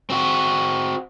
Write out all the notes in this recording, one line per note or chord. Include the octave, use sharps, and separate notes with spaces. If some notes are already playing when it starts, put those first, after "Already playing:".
C4 F#4